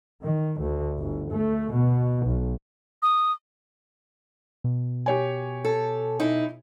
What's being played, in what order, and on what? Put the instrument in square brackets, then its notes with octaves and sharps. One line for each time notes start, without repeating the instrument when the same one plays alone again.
[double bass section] D#3
D2
G1
A3
B2
B1
[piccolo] D#6
[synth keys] B2
[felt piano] G4 C#5 G#5
[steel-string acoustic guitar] A4
D#4 E4